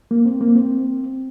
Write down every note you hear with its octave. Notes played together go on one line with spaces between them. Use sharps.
A#3
C4
A#3
C4